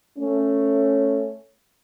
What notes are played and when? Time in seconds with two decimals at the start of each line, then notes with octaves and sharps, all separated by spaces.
0.19 A3 C#4